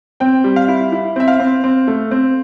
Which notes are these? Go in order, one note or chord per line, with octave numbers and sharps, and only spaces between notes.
C4 G5
G3
F5
E4
E4
C4 E5
F5
C4
C4
A3
C4